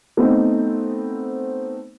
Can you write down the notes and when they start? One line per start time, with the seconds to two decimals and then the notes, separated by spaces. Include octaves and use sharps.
0.17 A3 B3 C4 D#4